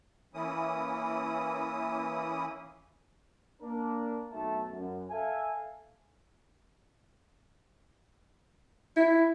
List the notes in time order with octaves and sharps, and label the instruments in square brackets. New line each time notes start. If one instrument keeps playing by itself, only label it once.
[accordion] E3 A#3 C#4 E4 D#6
[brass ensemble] A#3 D4 A#4
B1 A3 A5
F#2
A4 E5 F5 G#5
[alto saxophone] E4